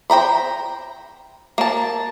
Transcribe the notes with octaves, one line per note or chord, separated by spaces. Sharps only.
C5 G5 A#5 B5
A#3 A5